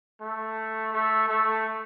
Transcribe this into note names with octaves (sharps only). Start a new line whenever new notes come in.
A3
A3
A3